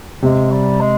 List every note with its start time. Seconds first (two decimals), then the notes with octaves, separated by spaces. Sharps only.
0.22 C3 G#3
0.51 G3
0.81 G#3